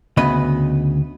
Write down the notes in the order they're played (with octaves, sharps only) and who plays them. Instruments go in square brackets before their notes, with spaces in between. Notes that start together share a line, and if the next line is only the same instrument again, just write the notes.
[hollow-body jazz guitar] D2 C#3 B3 B4 D#5